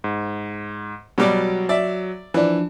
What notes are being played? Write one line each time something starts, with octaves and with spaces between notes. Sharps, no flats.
G#2
B2 F#3 G3 D5
D5 E5
E3 F3 D4